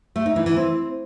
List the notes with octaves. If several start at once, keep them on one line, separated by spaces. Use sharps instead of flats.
A3
D#4
E3
E3
C4